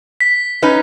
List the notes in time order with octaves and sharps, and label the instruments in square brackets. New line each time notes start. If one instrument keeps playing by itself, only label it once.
[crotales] B6
[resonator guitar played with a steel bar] C#4 D#4 B4